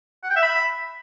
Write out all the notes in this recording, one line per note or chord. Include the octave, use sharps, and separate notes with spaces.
F#5
G5
E5
B5